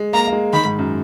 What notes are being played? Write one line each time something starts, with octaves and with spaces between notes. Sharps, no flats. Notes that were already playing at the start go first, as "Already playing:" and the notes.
Already playing: G#3
A#3 A#5
A#3
G#3
D#3 B5
G#2
F#2